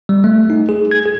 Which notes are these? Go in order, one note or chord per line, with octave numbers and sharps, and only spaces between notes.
G3
A3
D#4
G#4
G#6
G#4